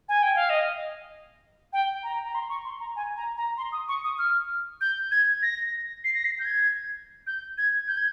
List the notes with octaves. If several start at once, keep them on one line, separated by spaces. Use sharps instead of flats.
G#5
G5
F5
D#5
G5
A#5
A#5
C6
C#6
C6
A#5
G#5
A#5
A#5
C6
D#6
C#6
D#6
F6
G6
G#6
A#6
C7
A#6
C7
G6
G#6
G6
G#6
G6
G#6